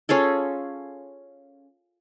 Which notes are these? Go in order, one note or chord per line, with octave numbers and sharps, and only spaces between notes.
C#4 F4 G#4 A4